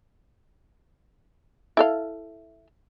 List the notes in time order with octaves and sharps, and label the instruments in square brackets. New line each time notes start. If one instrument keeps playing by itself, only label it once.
[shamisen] E4 A4 F5